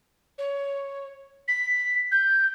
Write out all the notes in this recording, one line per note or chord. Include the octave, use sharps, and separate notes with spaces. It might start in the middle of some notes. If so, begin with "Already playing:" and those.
C#5
B6
G6